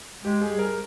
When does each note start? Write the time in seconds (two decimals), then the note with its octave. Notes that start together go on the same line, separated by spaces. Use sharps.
0.24 G#3 G4
0.41 G#4
0.50 G3
0.59 A#4